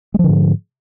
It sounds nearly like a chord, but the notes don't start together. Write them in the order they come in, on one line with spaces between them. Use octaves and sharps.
G#3 F3 D3 G#2